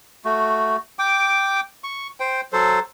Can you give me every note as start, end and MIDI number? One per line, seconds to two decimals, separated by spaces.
0.25 0.77 57
0.25 0.77 66
0.99 1.60 79
0.99 1.60 86
1.84 2.07 85
2.20 2.41 72
2.20 2.41 79
2.53 2.79 54
2.53 2.79 69
2.53 2.79 72